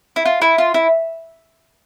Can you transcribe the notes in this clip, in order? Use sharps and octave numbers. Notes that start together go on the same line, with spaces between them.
E4
F4
E4
F4
E4